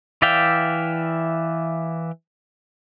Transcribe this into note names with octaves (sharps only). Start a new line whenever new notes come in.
E3 D5 E5 F5 G5